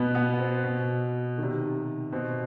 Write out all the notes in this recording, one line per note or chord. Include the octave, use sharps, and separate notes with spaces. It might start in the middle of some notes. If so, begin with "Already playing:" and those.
Already playing: B2 B3
B3
C4
B2
C3 D#3
B2 C4